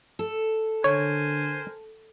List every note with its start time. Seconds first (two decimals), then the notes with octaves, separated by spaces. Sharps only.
0.19 A4
0.84 D3 A#4 C5 C#5 G#5